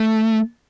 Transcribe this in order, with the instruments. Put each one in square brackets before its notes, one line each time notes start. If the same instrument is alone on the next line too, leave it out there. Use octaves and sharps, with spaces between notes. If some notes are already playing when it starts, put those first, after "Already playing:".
Already playing: [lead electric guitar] A3